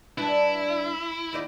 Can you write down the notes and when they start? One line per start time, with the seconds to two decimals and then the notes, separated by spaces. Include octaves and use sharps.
0.18 G2 D4 E4 B4
1.33 D#2 D#4 D5